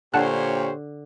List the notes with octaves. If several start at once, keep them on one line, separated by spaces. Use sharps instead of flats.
A#2 D3 G4 C5 C#5 F#5 A5 F#6